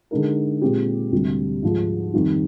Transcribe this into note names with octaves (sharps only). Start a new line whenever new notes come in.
D3 G#3 D#4 A#4
A#2 G#3 C4 G4
D2 C3 G3
G#2 F3 G#3
F2 D#3 G3